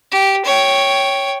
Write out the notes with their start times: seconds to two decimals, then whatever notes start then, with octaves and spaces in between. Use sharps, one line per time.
0.12 G4
0.45 C#5 G5